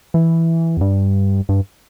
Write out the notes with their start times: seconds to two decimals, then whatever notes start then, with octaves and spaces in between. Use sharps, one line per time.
0.14 E3
0.77 E2
0.81 G2
1.49 G2